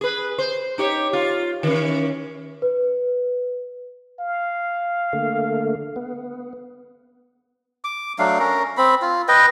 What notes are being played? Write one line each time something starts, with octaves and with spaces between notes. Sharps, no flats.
G#4 B4
C5
D#4 G4 C#5
F4
D#3 E3 C#4
B4
F5
D3 A3 A#3
B3
D6
F#3 A3 D4 F5
C#4 A#4
C4 B5
F4
B4 D#5 G5